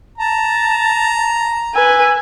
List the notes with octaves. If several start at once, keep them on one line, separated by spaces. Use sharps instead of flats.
A5 A#5
B4 G#5 E6